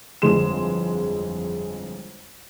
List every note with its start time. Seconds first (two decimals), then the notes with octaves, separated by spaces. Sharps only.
0.22 G1 F2 E3 G#3 C6 E7